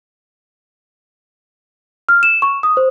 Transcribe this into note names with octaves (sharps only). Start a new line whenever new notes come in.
F6
E7
C#6
D#6
C5